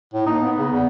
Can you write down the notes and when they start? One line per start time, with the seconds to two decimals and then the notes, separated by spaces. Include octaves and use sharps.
0.14 A2
0.26 A#3 D#4
0.41 B3
0.57 C#3
0.72 E2